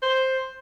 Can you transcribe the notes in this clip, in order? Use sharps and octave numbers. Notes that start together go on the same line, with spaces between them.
C5